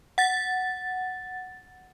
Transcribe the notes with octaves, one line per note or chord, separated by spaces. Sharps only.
F#5 A6